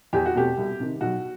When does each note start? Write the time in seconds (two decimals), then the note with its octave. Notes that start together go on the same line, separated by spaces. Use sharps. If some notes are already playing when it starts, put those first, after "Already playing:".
0.13 E2 G4
0.26 F#4
0.35 B2 A3 C4 G4
0.57 C2
0.80 C3 D#3
1.01 B1 F#4